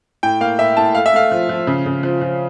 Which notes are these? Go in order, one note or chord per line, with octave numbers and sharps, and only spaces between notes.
A2 G5
A#3 F5
A2 E5
A2 A5
A3 F5
E5
A3 F5
F3
F3
C#3
C#3
F3
F3